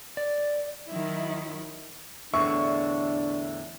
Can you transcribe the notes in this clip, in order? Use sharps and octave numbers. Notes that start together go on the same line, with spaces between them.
D5
D#3 F#3 E4
E2 A2 D3 D4 E5 C#6